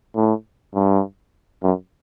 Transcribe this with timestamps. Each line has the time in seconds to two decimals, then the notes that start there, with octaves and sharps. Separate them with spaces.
0.16 A2
0.75 G2
1.63 F#2